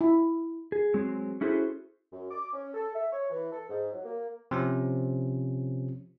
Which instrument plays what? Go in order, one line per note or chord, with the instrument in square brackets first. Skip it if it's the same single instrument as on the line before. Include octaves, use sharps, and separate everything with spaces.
[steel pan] E4
[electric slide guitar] G#4
F#3 G#3 C4
C#4 E4 F#4 G#4 A4 C5
[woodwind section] F#2
D6
C#4
A4
E5
C#5
E3
A4
G#2
F#3
A#3
[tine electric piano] C3 F3 C#4